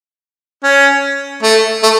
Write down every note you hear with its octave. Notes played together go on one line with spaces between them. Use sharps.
C#4
A3
A3